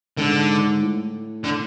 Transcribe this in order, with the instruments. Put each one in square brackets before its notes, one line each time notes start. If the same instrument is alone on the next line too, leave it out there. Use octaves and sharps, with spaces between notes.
[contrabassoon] G#2 [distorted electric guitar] D3
[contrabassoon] A2
[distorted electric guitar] D3